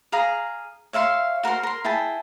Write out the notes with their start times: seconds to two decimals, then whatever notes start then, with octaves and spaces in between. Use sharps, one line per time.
0.12 G#4 F5 A#5 D#6
0.93 C#5 E5 F5 C6
1.43 F#4 A#4 C5 C6
1.63 A#4 C6
1.84 E4 G#4 G5 A5